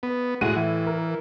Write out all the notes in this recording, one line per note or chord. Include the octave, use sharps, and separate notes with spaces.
B3
A2 G#3 F#4 D#7
E3
A#4